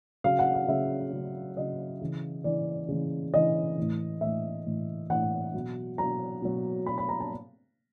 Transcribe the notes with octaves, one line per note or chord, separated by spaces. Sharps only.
C#3 F#3 F5
F#5
F5
C#3 F#3 E5
C#3 F#3
C#3 F#3 D#5
C#3 E3
C#3 E3 D5
C#3 E3
C#3 E3 D#5
A2 E3
A2 E3 E5
A2 E3
A2 E3 F#5
B2 F#3
B2 F#3 A#5
B2 F#3
B2 F#3 B5
B5
A#5
A5